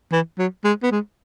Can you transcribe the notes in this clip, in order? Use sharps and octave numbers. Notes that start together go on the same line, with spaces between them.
E3
F#3
G#3
B3
G#3